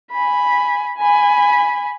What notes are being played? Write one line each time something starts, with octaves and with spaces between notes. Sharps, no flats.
G#5 B5
G#5 B5